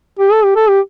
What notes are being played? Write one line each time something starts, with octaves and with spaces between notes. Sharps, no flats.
G4
A4
G4
A4
G4